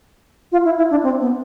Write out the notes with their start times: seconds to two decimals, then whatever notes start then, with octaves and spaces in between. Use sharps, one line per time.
0.52 F4
0.65 E4
0.78 E4
0.91 D4
1.03 C4
1.21 B3